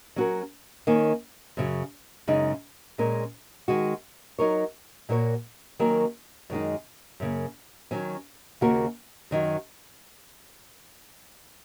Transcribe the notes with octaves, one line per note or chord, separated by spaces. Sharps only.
F#3 C#4 F#4 A#4
D#3 A#3 C#4
F#2 C#3 F#3
F#2 C#3 G#3 D#4
A#2 G#3 C#4 A#4
D#3 G#3 F#4
F#3 D#4 A#4 C#5
A#2 A#3 F#4 A#4 C#5
D#3 F#3 A#3 C#4 A#4
F#2 D#3 G#3 D#4
F#2 C#3 A#3
D#3 F#3 C#4
D#2 C#3 A#3 F#4 A#4
F#2 D#3 F#3